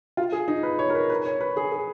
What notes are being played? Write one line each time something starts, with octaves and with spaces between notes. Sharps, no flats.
F4
G#4
D#4
B4
C#5
A#4
B4
B4
C#5
B4
G#4
G#4